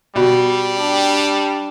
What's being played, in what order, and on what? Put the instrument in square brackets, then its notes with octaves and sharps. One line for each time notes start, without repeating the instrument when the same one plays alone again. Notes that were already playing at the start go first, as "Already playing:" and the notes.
[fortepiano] B2 [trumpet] G3
[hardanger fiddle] D4 G4